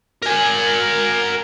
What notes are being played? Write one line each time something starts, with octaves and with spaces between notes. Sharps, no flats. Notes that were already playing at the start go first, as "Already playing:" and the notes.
A#4 G#5